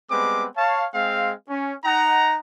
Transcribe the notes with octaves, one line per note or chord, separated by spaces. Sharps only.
G3 G#3 B3 C4 B4 D6
C#5 F5 A5
G#3 C4 G#4 F5
C#4
D#4 F#5 A#5